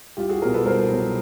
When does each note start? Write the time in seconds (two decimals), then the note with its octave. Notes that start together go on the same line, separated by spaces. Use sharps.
0.17 C2 F4 G4
0.29 F#4 G#4
0.42 B2 F#3 G#4 A#4
0.54 A4 B4
0.66 C2 A#4 C5
0.90 B2 F#3